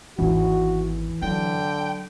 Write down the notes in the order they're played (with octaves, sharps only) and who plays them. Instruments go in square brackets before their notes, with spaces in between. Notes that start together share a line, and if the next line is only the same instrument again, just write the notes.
[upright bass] G#1 E2 [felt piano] E3 [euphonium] F#4
[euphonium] D3 [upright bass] F#3 [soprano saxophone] G5